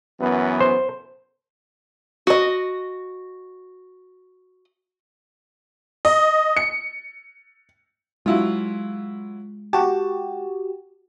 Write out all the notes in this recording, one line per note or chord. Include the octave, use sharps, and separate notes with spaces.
F#2 E3 B3
C5
F#4 D#5
D#5
C#7
F#3 G#3 E4 F4
F#4 G4 A5